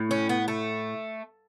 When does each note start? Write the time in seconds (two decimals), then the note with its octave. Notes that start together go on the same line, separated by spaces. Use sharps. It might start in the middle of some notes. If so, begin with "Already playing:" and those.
Already playing: A2
0.11 C#4
0.29 B3
0.48 A3